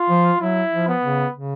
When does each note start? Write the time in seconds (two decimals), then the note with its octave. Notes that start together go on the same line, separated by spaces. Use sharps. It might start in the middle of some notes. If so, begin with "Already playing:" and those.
Already playing: F4
0.10 F3
0.40 F#3 E4
0.72 F3
0.88 B3
1.04 C#3
1.34 C#3